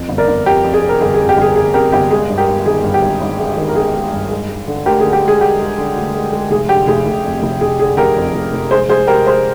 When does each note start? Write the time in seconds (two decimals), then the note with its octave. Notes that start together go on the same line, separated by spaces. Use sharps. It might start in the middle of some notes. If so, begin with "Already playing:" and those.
Already playing: F2
0.09 G1
0.18 A#4 D5
0.27 G1
0.46 F2 G4 A#4
0.64 F2
0.74 G#4
0.82 C3
0.89 A#4
1.01 G1 G#4
1.14 G#4
1.19 F2
1.29 G4
1.37 G1 G#4
1.56 G1 G#4
1.74 C3 G4 A#4
1.92 G1 G4
2.11 G#3 G#4
2.29 G2
2.38 G4 A#4
2.48 G2
2.66 D#3 G#4
2.84 G2
2.94 G4
3.02 G#1
3.21 G#1
3.39 G#3
3.57 D#3
3.69 A#4
3.75 D#3 G#4
3.94 G#3
4.13 G2
4.31 G#3
4.49 G#3
4.67 D3
4.86 D2 G4 A#4
5.00 G#4
5.04 D3
5.13 G4
5.23 G#3 G#4
5.41 G#3 G4
5.59 G#3
5.78 D3
5.96 D2
6.15 G#3
6.32 G#3
6.51 F1 G#4
6.69 D3 G4
6.87 F1 G#4
7.06 F1
7.24 F2
7.43 F1
7.61 F1 G#4
7.79 D3 G#4
7.97 F1 G4 A#4
8.17 F2
8.34 F1
8.53 F1
8.71 G#3 G#4 C5
8.89 G#3 G#4 C5
9.07 G#3 G4 A#4
9.26 G#3 G#4 C5